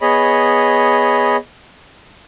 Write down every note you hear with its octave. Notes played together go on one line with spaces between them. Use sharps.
B3 G#4 C#5 D#5 B5